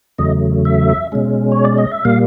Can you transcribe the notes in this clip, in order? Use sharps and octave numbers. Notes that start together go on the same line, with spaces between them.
E2 C#3 F#3 A3 D#5
E5
B2 G#3 C#4
C#5
D5
D#5
E5
A#2 G3 A#3 F5